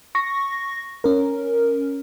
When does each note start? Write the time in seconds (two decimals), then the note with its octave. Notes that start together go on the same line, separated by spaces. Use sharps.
0.15 C#6 A#6
1.04 C#4 A#4